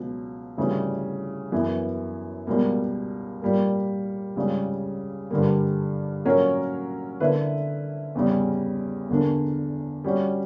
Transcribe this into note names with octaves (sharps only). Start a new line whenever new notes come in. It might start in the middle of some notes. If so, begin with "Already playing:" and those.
Already playing: C#2 B2 F#3
D2 C#3 E3 G3
F#2 E3 B3 E4
C#2 B2 G3 A#3
A#2 G3 A#3
C#2 C#3 G3
G2 D3 G3 A#3
A#2 F#3 C#4 F#4 A#4
D3 A#3 E4 B4 E5
E2 C#3 G3
E2 D3 A#3 D4 A#4
G3 C#4 F#4